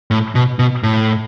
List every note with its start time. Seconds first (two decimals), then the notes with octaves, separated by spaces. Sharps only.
0.11 A2
0.35 B2
0.59 B2
0.83 A2